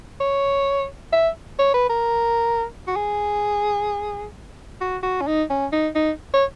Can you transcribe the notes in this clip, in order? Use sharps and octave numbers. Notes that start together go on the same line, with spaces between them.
C#5
E5
C#5
B4
A#4
F#4
G#4
F#4
F#4
C#4
D#4
C#4
D#4
D#4
C#5